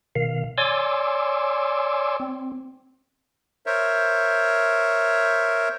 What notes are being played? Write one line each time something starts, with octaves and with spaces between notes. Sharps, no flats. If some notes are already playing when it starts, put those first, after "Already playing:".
B2 D#3 F5
C#5 D5 G#5 C6 D6 E6
C4
A#4 C5 C#5 E5